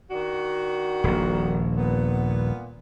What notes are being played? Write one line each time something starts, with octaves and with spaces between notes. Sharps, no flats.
D#3 D4 F#4
D#1 A#1
A#2 B3